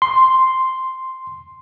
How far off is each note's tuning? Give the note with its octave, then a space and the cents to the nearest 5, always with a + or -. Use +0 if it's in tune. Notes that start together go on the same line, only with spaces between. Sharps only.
C6 +0